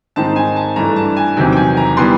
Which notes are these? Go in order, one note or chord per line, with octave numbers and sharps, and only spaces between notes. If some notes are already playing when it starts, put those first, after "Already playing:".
G#2 D#3 G#3 C4 A5
G#5
A5
G2 E3 A3 D4 A#5
A5
G#5
E2 C3 D#3 F#3 G5
G5
G#5
A#5
E3 G3 B3 D4 C6